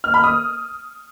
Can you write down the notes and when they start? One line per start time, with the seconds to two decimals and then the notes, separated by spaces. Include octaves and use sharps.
0.04 F6
0.14 B5
0.24 D#6